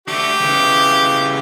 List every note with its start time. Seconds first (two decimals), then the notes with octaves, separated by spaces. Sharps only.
0.08 A3 D4 G4
0.41 C#3 E3